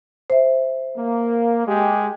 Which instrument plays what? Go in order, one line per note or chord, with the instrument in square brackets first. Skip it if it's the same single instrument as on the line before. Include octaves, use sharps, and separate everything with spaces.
[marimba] C5 E5
[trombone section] A#3
G#3 G4